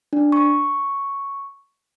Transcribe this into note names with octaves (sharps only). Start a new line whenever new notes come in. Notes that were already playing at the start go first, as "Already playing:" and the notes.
D4
C#6